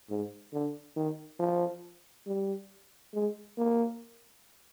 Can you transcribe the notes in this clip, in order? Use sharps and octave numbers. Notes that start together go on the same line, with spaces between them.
G#2
D3
D#3
F3
G3
G#3
A#3